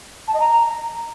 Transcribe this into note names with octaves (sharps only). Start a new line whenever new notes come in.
A5
D#5
A#5